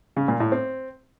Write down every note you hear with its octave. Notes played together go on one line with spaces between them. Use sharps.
C#3
A#2
A2
C4